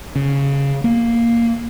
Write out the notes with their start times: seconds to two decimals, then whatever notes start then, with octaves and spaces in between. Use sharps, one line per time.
0.16 C#3
0.84 A#3